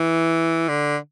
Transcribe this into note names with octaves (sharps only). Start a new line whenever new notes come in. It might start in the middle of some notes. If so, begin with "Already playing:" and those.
Already playing: E3
D3